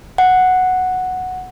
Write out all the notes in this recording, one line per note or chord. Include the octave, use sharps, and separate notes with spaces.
F#5